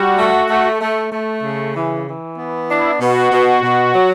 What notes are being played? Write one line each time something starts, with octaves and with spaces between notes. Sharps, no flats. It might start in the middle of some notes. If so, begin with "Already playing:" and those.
Already playing: G3 F#4
A3
A3
A3
A3
C#3
E3
E3
B3
D4 E4
B2 F#4
B2
B2
F#3